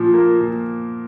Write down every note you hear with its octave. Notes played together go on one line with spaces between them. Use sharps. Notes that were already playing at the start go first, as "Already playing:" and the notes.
Already playing: A#2 F3
A#3
A#2